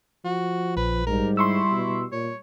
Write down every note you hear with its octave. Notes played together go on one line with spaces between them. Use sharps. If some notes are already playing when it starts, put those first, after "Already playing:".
F3 F#4
A#1 B4
G#2 G3 A#4
E4 C6 C#6 E6
B2
A#2 C#5